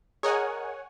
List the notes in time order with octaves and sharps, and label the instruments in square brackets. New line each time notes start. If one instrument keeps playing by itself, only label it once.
[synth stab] G#4 A#4 D#5 [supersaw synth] C#5 F#5 G#5